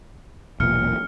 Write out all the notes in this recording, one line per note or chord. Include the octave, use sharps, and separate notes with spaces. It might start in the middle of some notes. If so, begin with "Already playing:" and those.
E1 B1 A#2 F6 C#7